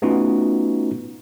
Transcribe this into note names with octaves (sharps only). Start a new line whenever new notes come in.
A3 B3 C#4 D#4 F4 F#4